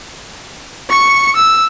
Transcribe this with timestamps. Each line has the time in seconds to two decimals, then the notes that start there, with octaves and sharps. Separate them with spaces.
0.90 C#6 C#7
1.36 E6